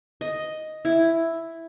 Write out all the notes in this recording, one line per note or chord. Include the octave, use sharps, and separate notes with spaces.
D#5
E4